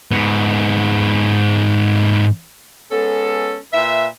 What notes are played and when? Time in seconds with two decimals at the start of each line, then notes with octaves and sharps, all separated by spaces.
0.12 G#2 B3
2.92 G#3 B3 C#4 A4
3.72 A#2 B4 E5